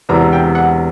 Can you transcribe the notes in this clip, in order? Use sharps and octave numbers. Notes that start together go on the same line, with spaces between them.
E1 E2 C3 E3 A#5
G5
F#5